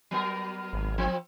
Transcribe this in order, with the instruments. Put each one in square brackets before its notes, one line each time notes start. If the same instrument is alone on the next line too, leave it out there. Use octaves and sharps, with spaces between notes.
[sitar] F#3 B3 A#4
[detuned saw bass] G#1
[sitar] F3 C4